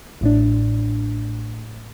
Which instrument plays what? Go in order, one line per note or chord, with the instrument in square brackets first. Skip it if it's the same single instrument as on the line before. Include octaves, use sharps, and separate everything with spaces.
[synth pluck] A1 A2 D4